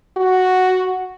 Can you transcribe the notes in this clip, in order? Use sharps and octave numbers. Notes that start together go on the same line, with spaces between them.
F#4